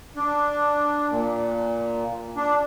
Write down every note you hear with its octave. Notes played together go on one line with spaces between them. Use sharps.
D4
A#2
D4